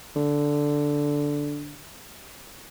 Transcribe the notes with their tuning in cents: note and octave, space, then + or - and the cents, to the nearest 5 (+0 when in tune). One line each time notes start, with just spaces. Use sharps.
D3 -5